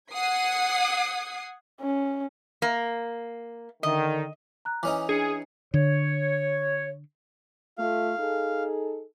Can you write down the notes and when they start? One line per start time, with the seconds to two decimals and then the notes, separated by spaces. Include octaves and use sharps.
0.12 F#5 D#6 G#6 C7
1.81 C#4
2.62 A#3
3.83 D3 D#3 D#5
4.65 A#5 F#6
4.83 E3 C#4 D#4 D6
5.09 D4 G#4 C7 C#7
5.74 D3 C#5
7.78 A3 F4 F5
8.18 D#4 G#4 A4